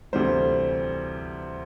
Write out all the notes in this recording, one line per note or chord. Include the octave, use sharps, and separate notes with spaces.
D2 C3 E3 G3 C5